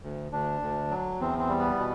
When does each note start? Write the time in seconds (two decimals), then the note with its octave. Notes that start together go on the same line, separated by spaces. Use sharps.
0.03 D2
0.32 D2 D4
0.61 D2
0.91 F#3
1.20 E2 C4
1.40 C4
1.49 G3
1.59 B3
1.79 B2